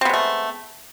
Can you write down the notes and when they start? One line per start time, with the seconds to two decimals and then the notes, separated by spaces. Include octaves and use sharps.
0.01 C4
0.05 B3
0.09 G#3
0.13 A3